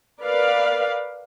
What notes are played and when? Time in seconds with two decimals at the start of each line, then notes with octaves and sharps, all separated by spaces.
0.22 A#4 B4 D5 F5